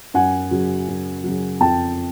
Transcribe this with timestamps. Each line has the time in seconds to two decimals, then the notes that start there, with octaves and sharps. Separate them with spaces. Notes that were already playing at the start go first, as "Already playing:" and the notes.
0.14 F#2 F#5 G#5
0.51 C#3 F#3
0.88 F#2
1.24 C#3 F#3
1.61 F2 G5 A5